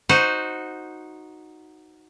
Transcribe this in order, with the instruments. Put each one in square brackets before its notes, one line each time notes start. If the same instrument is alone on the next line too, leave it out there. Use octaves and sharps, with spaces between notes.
[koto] D#4 F#4 C5